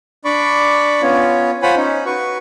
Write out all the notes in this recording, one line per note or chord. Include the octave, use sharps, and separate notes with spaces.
D4 D5 B5 C#6 D6
B3 C#4 F4 C#5
F4 C5 C#5 F#5 G#5 B5
C#4 D#4
F#4 B4 C#6